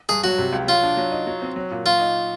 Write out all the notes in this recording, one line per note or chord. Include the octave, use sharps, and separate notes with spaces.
G2 G#4
F#3 F#4
C3
C#2
F#3 F4
D4
F#3
D#4
F#3
C4
F#3
A#2
F#3 F4
D#4